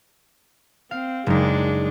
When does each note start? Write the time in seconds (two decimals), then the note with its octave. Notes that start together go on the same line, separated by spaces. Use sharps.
0.91 C4 F5
1.26 F#1 G#3 D4 D#4